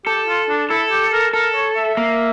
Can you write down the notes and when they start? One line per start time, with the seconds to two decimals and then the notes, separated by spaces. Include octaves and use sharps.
0.06 G4 A4
0.27 F4
0.49 D4
0.70 E4 A4
0.91 G4
1.13 A#4
1.33 A4 A#4
1.55 C#5
1.76 E5
1.97 A#3